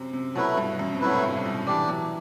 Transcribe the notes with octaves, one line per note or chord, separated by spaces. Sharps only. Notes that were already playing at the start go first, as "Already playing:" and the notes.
Already playing: F#2 C3
C3
B2 F#3 A3 E4 B4
G2
F#2
C3
B2 F#3 A3 E4 B4
A2
G2
B2
E3 D4 G4 D5
F#3